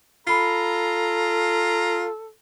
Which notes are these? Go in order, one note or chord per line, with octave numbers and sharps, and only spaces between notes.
F4 A4 A#5 B5 C7